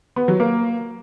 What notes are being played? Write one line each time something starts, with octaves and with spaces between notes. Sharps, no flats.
B3
F#3
A#3